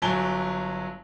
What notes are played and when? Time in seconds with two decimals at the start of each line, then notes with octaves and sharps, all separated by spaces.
0.02 G1 F#3 G#5 A5 G7